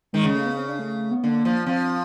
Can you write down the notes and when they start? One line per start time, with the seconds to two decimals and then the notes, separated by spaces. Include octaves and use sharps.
0.13 D#3 G#3
0.24 C#3
0.35 A3
0.46 B3
0.57 C4
0.68 D4
0.79 A3
1.11 B3
1.23 D3 A#3
1.45 F3
1.66 F3 C4